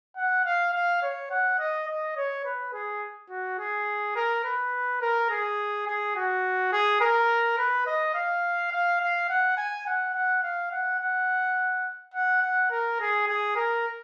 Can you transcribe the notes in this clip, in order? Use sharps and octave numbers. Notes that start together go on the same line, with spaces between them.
F#5
F5
F5
C#5
F#5
D#5
D#5
C#5
B4
G#4
F#4
G#4
A#4
B4
A#4
G#4
G#4
F#4
G#4
A#4
B4
D#5
F5
F5
F5
F#5
G#5
F#5
F#5
F5
F#5
F#5
F#5
F#5
A#4
G#4
G#4
A#4